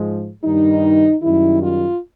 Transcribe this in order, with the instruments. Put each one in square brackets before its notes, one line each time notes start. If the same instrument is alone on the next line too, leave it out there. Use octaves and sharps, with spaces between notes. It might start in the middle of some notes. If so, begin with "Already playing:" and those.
Already playing: [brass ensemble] G#2 F3 G#3
G2 D#3 G3 D#4
F#2 D#3 G3 E4
F4